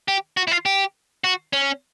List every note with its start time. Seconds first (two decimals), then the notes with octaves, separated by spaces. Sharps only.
0.08 G4
0.37 F#4
0.48 E4
0.51 F4
0.66 G4
1.24 F#4
1.53 C#4